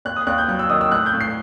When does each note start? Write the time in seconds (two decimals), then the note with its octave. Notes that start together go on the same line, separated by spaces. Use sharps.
0.05 D#2 F#6
0.16 D#6
0.27 D#2 F#6
0.38 G6
0.48 F#3 F#6
0.59 E6
0.70 D#3 D#6
0.81 E6
0.91 A2 F#6
1.06 G6
1.14 A2
1.21 C7